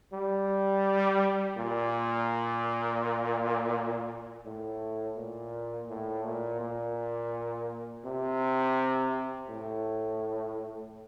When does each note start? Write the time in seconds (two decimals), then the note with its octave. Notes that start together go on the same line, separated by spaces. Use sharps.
0.13 G3
1.57 A#2
4.45 A2
5.16 A#2
5.89 A2
6.25 A#2
6.60 A#2
8.05 C3
9.49 A2